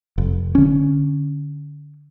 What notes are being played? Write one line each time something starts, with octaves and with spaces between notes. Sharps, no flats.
F1
D3 C#4